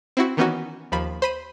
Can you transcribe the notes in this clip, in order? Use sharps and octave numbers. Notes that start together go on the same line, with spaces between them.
C4 E4 F#4
D#3 E3 B3 C#4 D#4 F#4
D#2 F3 B5
C5 B5 D#7